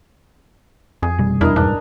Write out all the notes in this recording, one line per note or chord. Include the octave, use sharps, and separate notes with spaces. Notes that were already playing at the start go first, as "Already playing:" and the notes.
F2 G#4
F1 B2 G3
E2 D4 E4 A#4 D#5
G#2 E3 D4